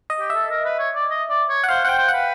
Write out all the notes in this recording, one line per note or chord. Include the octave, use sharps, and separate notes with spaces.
D#5
G4
E5
A4
A#4
B4
C#5
D5
D#5
D5
C#5
F#5
C5 F5
C5 F#5 G5
C5
F#5
B4